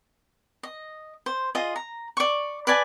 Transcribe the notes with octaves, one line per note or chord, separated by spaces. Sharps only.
D#5
C5
F4 G#4 D#5
A#5
D5 C#6
B4 D5 G#5 A5